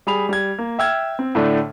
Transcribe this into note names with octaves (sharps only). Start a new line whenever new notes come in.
G3 G#4 B5 F7
G3 G#6
A#3
E5 G5 E6 F6 G#6
C4
A2 D3 A3 D4